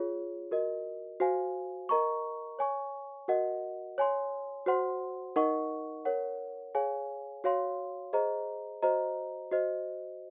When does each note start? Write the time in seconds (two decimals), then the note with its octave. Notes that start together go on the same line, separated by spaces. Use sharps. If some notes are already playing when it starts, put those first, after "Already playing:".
Already playing: F4 G#4 C#5
0.51 F#4 A#4 D#5
1.20 F#4 C5 F5 G#5
1.89 A#4 D#5 A#5 C#6
2.59 C#5 G#5 C#6
3.28 F#4 A#4 D#5 F#5
3.98 C#5 G#5 C6
4.66 F#4 C5 F#5 C6
5.36 D#4 A#4 D#5 F#5 C#6
6.05 A#4 C#5 F#5
6.75 G#4 C#5 F5 G#5
7.44 F#4 C#5 F5 C6
8.13 G#4 C5 D#5 A#5
8.83 F#4 C5 D#5 A#5
9.51 F#4 C5 D#5